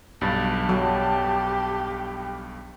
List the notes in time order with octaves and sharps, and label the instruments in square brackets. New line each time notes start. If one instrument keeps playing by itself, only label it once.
[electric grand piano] B1 G2 A6 [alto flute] A5
[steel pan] F#3 [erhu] G4